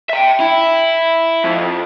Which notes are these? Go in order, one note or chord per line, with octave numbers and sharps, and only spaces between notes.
E5 G5
E4
F2